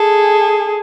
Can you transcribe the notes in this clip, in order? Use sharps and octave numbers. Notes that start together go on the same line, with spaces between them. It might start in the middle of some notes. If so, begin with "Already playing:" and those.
Already playing: G#4 A4